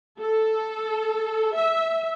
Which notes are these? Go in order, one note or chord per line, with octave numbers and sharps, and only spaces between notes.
A4
E5